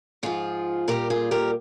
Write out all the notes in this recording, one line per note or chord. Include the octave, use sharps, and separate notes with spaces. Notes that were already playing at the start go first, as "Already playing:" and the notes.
G#2 F3 F4 G#4
A#2 G3 G4 A#4
F4 G#4
G4 A#4